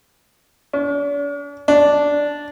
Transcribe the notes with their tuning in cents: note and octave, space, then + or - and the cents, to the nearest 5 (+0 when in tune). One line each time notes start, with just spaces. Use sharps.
D4 -45
D4 -5